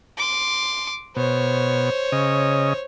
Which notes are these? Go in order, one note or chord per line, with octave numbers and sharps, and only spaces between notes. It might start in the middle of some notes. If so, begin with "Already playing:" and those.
C6 D6
B2 C5 C#5
C#3 D#5